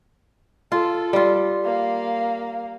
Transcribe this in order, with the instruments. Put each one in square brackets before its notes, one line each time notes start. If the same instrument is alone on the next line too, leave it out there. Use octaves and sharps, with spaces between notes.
[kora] F4 [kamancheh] A4
[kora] G3 F4
[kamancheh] A#3 F5